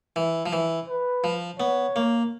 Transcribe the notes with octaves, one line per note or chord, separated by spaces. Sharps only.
E3
F3
E3
B4
F3
B3 C#5
A#3